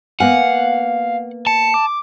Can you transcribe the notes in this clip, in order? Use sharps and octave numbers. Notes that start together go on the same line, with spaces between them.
A#3 B3 F5 F#5 G#5
A5 C#7
D6